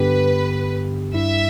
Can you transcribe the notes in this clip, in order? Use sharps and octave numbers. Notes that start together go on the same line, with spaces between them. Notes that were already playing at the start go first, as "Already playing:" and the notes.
Already playing: G2 D3 B3 G4 B4
G2 G3 E4 E5